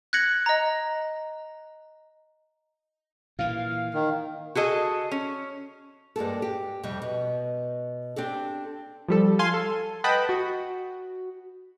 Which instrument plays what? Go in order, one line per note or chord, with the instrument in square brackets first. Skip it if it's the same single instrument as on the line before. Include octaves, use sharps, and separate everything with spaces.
[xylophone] F#6 G#6 A#6 C#7 F#7
D#5 A#5
[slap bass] A#2 E3 [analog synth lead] F5
[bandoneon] D#3
[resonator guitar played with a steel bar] F#4 G#4 A4 D#5
C#4
[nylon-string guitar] G2 G#3 A#3 A4
G4
F2 C3 G3
B2
C4 D4 G4 A4
[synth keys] F3 G3 A4
F5 G#5 C6
A4
B4 D#5 F#5 G5 A5 B5
F#4